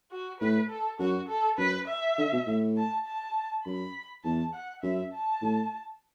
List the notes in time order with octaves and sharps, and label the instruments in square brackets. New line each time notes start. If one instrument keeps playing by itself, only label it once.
[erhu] F#4
[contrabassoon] A2 [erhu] B4
[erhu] A4
[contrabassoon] F#2 [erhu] F#4
[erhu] A4
[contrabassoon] F#2 [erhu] B4
[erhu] E5
[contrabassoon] D3
B2
A2
[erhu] A5
A5
[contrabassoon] F#2 [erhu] B5
[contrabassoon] E2 [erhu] A5
[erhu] F#5
[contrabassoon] F#2 [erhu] E5
[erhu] A5
[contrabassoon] A2